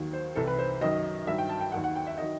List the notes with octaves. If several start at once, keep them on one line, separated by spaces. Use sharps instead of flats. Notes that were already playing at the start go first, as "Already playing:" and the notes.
Already playing: D#2 D#3 F#3
C5
C2 C3 E3 A4
B4
C5
F#2 D#3 F#3 D#5
G2 D#3 F#3 E5
G5
A5
G5
D#2 D#3 F#3 F#5
F#5
G5
E5
D#3 F#3 D#5